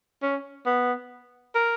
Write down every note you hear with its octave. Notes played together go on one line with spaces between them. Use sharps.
C#4
B3
A#4